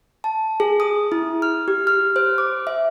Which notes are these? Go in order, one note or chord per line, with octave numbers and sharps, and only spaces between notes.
A5
G#4
D#6
E4
F6
G4
F6
C5
D6
E5